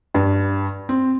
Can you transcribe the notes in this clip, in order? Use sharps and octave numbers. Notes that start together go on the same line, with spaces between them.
G2
C4